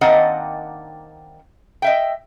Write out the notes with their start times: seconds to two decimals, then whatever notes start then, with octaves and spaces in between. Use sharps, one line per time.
0.01 D#3 A#3 C4 D4 D#5 F#5
1.82 D#5 E5 G5